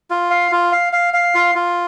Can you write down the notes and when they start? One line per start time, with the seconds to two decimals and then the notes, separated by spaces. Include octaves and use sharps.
0.10 F4
0.31 F5
0.52 F4
0.72 F5
0.93 F5
1.14 F5
1.35 F4
1.55 F4